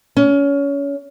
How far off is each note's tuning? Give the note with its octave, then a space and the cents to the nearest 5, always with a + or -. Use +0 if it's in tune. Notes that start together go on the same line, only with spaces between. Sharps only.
C#4 +25